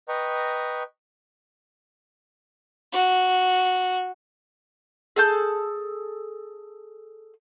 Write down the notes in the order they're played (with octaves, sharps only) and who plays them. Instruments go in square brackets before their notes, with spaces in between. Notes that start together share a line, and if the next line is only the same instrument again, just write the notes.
[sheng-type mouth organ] B4 D#5 G5 A#5 C#6
[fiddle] F#4
[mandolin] G#4 A4 A5 G6